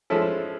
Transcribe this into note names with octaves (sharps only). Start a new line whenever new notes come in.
F3 G#3 C#4 E4 A4